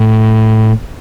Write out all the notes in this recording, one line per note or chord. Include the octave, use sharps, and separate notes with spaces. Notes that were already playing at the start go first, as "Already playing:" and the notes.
Already playing: A2